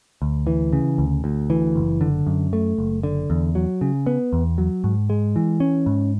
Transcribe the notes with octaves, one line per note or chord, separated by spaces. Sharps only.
D2
E3
C#3
D2
D2
E3
F#1
D3
F#2
A3
F#1
D3
E2
F#3
C#3
B3
E2
F#3
G#2
G#3
E3
C#4
G#2